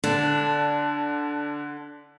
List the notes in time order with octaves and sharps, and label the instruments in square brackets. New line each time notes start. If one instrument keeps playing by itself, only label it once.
[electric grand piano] D3 [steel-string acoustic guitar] D4